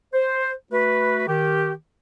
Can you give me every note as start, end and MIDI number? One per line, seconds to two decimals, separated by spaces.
0.13 0.52 72
0.71 1.26 57
0.71 1.26 66
0.71 1.26 71
1.28 1.71 51
1.28 1.71 67